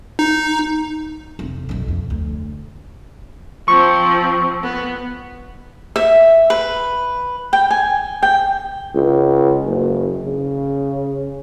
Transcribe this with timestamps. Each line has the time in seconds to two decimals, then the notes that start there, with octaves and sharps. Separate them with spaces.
0.19 D#4
1.39 F2 C3
1.69 B1 F#2
1.88 F2
2.10 D2
3.68 F3 C4 C#6
4.63 B3
5.96 E5
6.50 B4
7.53 G5
7.71 G#5
8.23 G5
8.95 C#2
9.64 F#1
10.25 C#3